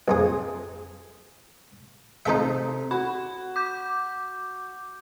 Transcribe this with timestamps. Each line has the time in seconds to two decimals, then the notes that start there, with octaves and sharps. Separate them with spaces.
0.08 A#1 F2 G#4
2.26 C3 A3 D#4 A4 E5
2.91 F#4 B5
3.56 D6 G6